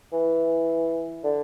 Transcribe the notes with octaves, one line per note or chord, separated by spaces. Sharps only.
E3
D3